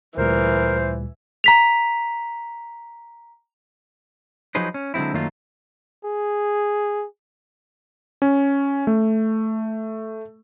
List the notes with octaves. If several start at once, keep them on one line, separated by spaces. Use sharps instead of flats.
D2 A#2 E3 G3 A#4 C5
A#5 B6 F7
F3 F#3 D#4 G#4 B4 C5
C#4
D3 F#3 G#3 C4 E4
F#2 D#3 F#3 A3 A#3 F4
G#4
C#4
A3